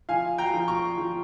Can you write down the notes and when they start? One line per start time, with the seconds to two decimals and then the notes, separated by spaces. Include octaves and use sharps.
0.09 F3 F5 G#5
0.38 G5 A#5
0.54 F3
0.68 A#5 C#6
0.98 F3